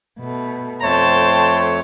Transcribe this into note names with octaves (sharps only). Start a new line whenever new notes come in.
B2 A3
F2 A3 C5 C#5 G5 A5 C6